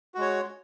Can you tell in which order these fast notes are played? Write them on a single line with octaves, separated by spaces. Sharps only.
F#4 G#3 C#5